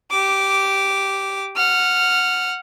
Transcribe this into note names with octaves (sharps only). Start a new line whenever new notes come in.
G4 D6
F#5 F6